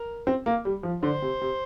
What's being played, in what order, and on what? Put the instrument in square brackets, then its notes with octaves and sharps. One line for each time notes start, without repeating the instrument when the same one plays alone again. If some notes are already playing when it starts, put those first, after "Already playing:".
Already playing: [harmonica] A#4
[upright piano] C4
A#3
G3
F3
[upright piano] D3 [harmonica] C5
[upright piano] C3
C3